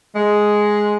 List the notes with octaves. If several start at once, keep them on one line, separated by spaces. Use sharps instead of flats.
G#3